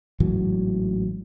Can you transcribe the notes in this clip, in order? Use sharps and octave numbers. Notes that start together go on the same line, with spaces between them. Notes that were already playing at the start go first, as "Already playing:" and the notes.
A1 G#2 E3 F#3